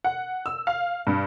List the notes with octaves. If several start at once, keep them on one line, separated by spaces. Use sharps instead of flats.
F#5
E6
F5
G2